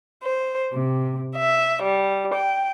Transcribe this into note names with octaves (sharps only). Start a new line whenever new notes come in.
C5
C3
E5
G3
G5